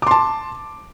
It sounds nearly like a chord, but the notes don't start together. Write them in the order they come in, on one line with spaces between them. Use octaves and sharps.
D6 C6 A5